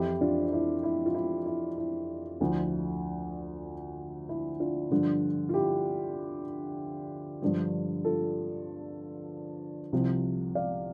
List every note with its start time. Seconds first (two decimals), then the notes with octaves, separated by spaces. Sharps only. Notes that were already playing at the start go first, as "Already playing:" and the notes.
Already playing: F2 E3 E4 G4
0.21 D4 F4
0.53 E4
0.83 E4
1.06 F4
1.15 E4
1.46 E4
1.78 E4
2.41 D2 D3 F3 E4
4.29 E4
4.60 D4 F4
4.91 G2 D3 F3
5.49 F4
5.54 E4 G4
7.42 G2 D3 F3
8.05 F4 A4
9.92 C2 C3 F3
10.55 D5 F5